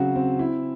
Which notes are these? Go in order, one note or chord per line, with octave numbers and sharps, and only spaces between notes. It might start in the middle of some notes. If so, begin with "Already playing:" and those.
Already playing: C#3 F#3 C4 F#4
C4
E4